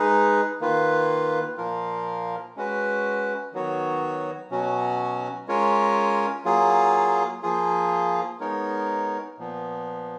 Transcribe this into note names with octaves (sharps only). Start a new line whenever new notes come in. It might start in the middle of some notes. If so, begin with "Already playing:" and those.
Already playing: G#3 D#4 G#4 B4
D#3 A#3 F4 B4
A#2 F3 A#3 F4 A#4
G#3 C#4 F#4 B4
D#3 F#3 B3 F#4 C#5
B2 F#3 C#4 F#4
G#3 C#4 F4 A#4 C#5
F#3 A#3 F4 G#4
F3 A#3 F4 G#4
G#3 B3 D#4 A#4 C#5
A#2 F3 B3